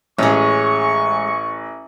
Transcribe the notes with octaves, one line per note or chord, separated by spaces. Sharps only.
A1 G#3 C#4 C#6